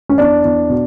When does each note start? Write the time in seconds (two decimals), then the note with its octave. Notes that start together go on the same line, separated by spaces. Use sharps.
0.09 C#4
0.18 E2 D4
0.44 E2
0.69 B2